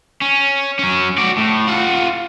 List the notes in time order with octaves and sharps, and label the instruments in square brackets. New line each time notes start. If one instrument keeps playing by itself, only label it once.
[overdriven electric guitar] C#4
F#3 C#4
F#4 D5
A2
F4 F#5